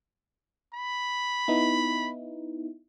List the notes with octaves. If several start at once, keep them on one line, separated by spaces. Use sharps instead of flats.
B5
B3 D#4 E4